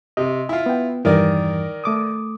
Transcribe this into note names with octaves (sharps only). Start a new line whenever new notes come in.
C3 D#5
E4 F4
B3 G5
E2 G2 D#3 E3 A#4 D5
A3 D6 D#6